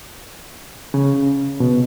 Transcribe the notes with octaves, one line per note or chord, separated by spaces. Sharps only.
C#3
B2